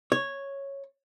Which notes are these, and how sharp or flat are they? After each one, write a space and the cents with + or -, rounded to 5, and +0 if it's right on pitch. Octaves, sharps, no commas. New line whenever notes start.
C#5 -5